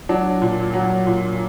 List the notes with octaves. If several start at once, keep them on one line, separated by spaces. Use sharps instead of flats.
F#3 D4
A#2
F#3
A#2